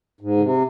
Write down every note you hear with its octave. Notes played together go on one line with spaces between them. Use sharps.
G#2
D3
C3